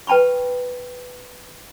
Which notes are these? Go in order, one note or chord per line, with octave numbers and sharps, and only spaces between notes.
B4 G5 A5 B5 C#6